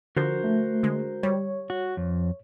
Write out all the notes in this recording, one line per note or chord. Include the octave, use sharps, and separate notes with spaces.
D3 F3 F#4 A#4 C5
A3
D3 G#3
G3 C#5
F#4
F2